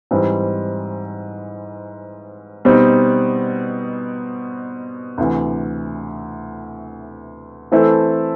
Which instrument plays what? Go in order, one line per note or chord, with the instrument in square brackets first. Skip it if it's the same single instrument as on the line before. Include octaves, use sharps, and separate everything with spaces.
[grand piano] G#2 E3 G3 C4
B2 G3 C4 D#4
D2 C3 E3
E3 A3 C4 E4 A4